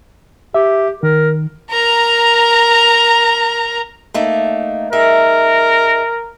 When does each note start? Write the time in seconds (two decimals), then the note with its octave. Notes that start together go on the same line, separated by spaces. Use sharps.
0.54 G4 E5
1.03 D#3 A#4
1.71 A#4 A#5
4.14 A3 A#3 D#4
4.93 D#4 G#4 A#4 E5